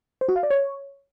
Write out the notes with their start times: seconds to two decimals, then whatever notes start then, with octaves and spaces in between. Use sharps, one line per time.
0.21 C5
0.29 F#4
0.36 F5
0.43 D5
0.50 C#5